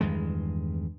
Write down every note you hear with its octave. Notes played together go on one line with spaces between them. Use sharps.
E2 G2 D#3 G#3